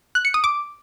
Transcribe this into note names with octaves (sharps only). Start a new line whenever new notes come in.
F#6
C#7
D#6
D6